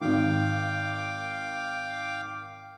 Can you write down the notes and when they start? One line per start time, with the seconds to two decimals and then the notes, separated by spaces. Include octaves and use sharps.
0.01 G#1 D#3 F5 G5 D6